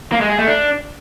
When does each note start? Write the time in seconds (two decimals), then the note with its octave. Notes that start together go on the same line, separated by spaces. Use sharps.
0.12 A#3
0.21 G#3
0.30 G#4
0.39 A3
0.47 D4